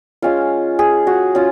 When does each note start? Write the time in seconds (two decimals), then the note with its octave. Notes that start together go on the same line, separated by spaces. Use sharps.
0.22 G#3 C#4 F4 F5
0.79 G#4
1.07 F#4
1.35 C#4 F4